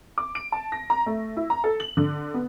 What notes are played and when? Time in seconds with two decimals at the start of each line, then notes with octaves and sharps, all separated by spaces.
0.18 D6
0.35 D7
0.52 A5
0.72 A#6
0.90 A#5
1.06 A3
1.37 E4
1.50 A#5
1.64 A4
1.80 F#7
1.97 D3
2.34 B3